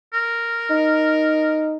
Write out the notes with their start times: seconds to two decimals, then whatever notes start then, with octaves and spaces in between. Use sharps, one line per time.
0.13 A#4
0.70 D#4